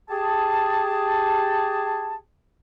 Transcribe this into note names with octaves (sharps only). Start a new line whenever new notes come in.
G4 G#4 A5